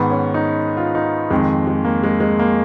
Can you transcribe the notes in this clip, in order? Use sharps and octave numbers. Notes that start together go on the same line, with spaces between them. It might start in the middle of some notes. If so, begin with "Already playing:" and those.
Already playing: G#2 D#3 B3
C#4
D#4
F4
D#4
F2 D#3 G#3
G#3
A#3
G#3
G#3
A#3